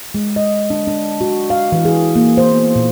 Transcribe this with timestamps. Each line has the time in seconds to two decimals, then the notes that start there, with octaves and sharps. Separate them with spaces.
0.14 G#3
0.36 D#5
0.70 D4
0.87 D4
1.21 F#4
1.50 F5
1.72 E3
1.85 G#4
2.16 A#3
2.37 C5
2.51 B3
2.76 A#2